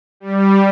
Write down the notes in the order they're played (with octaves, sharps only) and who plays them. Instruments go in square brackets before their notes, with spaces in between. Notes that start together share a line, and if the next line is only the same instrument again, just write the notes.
[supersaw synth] G3